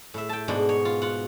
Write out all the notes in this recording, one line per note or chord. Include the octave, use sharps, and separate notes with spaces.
A2 E5
G5 A5
G#2 B2 D4
C#5
F4
F4 F#5